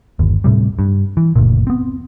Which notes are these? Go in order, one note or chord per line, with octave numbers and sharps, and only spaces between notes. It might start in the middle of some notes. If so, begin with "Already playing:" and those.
G1 D#2
A2 C3 G3
G2
E3
F#1 D2 A#2
B3 C4